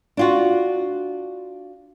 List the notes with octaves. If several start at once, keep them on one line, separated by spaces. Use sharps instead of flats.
D4 F4 F#4